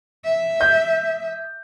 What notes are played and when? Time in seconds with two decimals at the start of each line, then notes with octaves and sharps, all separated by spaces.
0.25 E5
0.60 D#5 G6